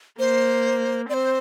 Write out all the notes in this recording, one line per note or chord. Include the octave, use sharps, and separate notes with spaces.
A#3 C5
C4 C5 D5